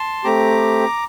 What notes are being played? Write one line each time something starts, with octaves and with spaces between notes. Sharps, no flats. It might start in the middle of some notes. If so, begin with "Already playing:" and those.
Already playing: A5 C6
A3 C4 G4 A#5 D6